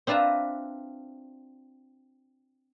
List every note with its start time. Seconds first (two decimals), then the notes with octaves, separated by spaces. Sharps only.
0.07 C4 D4 F4 B4 E5 A#5